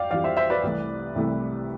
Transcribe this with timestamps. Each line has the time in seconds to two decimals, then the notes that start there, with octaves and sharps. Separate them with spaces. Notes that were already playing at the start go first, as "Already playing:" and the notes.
Already playing: F2 D5 F5 G5
0.11 F2 E3 G3 D5 F5
0.24 C5 E5
0.37 C5 E5
0.50 B4 D5
0.63 C2 C3 E3 A3
1.15 C2 C3 E3 A3